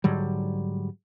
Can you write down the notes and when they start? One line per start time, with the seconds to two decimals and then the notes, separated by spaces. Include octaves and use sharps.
0.04 G#2 D3 F#3 G3